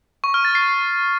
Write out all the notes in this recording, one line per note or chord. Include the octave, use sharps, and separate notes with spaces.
C#6
F6
A6
C7